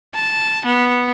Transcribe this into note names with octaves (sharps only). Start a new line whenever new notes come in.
A5
B3